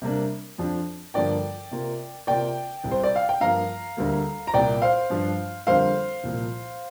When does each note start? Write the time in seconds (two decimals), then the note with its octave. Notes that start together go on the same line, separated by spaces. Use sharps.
0.02 C3 G3 A#3 D4
0.58 F2 F3 D4
1.14 G2 D3 F3 A#3 D5 G5
1.71 C3 A#3 F4
2.27 C3 A#3 F4 D5 G5
2.84 C2 C3 G3
2.91 C5
3.03 D5
3.16 F5
3.29 G5
3.41 G2 F3 A#3 F5 A#5
3.97 D2 D3 G3 A#3
4.47 A#5
4.53 C2 A#2 A#3 D5 G5
4.82 C5 F5
5.10 G2 F3 D4
5.67 F2 D3 G3 A#3 D4 C5 F5
6.23 C2 A#2 F3